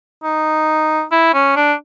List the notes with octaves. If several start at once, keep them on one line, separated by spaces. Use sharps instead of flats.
D#4
E4
C#4
D4